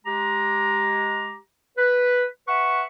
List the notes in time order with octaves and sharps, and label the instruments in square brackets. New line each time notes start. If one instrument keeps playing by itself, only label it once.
[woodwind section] G#3 G4 A#5
B4
B4 E5 F#5 C#6